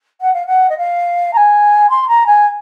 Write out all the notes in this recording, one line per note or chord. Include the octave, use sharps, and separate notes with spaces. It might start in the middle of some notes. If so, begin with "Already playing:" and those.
F#5
F5
F#5
D#5
F5
A#5
G#5
C6
A#5
G#5